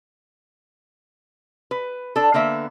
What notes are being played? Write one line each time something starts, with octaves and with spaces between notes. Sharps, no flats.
B4
D4 A4
D3 A#3 B3 E5